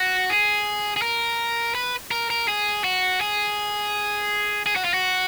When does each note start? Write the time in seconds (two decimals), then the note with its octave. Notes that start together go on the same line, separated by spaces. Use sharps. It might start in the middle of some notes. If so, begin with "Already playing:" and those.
Already playing: F#4
0.30 G#4
0.96 G#4
1.02 A#4
1.75 B4
2.11 A#4
2.30 A#4
2.48 G#4
2.84 F#4
3.21 G#4
4.66 G#4
4.76 F#4
4.85 F4
4.94 F#4